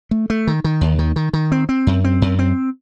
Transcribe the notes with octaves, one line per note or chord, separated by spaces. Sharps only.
A3
A3
D#3
D#3
D#2
D#3
D#3
D#3
C4
C4
F#2
C4
F#2
C4